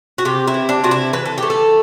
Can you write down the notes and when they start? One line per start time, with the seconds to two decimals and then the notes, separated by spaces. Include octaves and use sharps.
0.18 F#4
0.25 C3 G4
0.47 E4
0.54 E3
0.69 D4
0.84 C3 F#4
0.91 E4
1.13 E3 B4
1.26 A4
1.38 A3 G4
1.50 A4